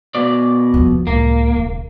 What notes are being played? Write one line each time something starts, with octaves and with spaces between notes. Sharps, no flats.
B2 D5
D#2 F3
C#2 A2 A#3
D#1